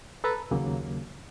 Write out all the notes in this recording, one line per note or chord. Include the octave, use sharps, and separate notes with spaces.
A4 B4 A5 A#5
D#2 C#3 F#3 A#3